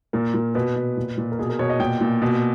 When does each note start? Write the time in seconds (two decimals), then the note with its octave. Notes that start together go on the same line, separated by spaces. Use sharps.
0.13 A#2 A#4
0.34 A#2
0.55 B2 B4
0.76 B2
0.97 A#2
1.18 A#2
1.32 A#4
1.39 B2 G#4
1.49 A#4
1.59 B2 C#5
1.69 D#5
1.80 A#2 G5
2.01 A#2
2.22 B2